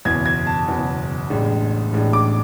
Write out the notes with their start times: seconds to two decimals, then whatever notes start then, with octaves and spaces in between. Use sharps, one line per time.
0.05 F#1 E2 B2 G#6
0.26 G#6
0.47 A5
0.68 F#1 E2 B2
1.30 A1 A2 G#3 D4
1.92 A1 A2 G#3 D4
2.13 D6